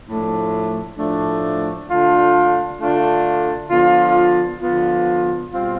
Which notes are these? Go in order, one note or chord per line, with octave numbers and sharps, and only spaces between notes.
A2 F3 A3 D4
A2 F3 A3 D4
D3 A3 D4 F4
D3 A3 D4 F4
D3 F3 B3 F4
D3 F3 B3 F4
B2 G3 C4 F4